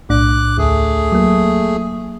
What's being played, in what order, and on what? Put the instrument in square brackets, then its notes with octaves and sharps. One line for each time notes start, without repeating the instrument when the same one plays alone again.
[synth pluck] B1 A2 D4 [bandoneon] D6 F#6
[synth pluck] D2 [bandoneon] A3 G#4
[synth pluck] F#3 A#3